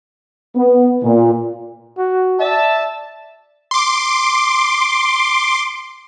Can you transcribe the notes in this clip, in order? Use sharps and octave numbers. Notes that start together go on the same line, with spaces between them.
B3
A#2
F#4
D5 E5 A5
C6 D6